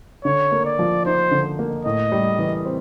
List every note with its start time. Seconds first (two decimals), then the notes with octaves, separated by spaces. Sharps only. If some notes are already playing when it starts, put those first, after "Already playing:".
0.24 D3 C#5
0.52 A#3
0.65 D5
0.79 F3
1.05 D#4 C5
1.31 D3
1.59 A#3
1.85 A2 D#5
2.12 G3
2.39 E3
2.65 C4